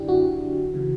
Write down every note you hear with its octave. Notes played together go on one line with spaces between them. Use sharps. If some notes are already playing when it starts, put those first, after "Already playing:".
Already playing: F#2 D3 D4 E4 G4
F#4
C#3 E3